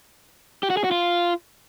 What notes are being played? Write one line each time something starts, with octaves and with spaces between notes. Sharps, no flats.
G4
F#4
G#4
F#4
F4